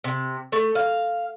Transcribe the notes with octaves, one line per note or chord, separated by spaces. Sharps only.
C3
A3
F5